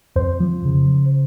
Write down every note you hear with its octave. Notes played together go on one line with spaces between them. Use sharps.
F2 C5
F3
C#3